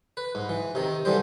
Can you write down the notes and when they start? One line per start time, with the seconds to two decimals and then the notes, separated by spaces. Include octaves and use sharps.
0.17 B4
0.35 G#2
0.49 E3
0.75 C3 D#3
1.05 D3 E3 G3 C5